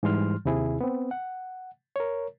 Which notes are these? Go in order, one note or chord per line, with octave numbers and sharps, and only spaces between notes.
G#2 E3 G3 C6 F6
D#2 C3 E4 G#4
B3 C4
F#5
A#4 C#5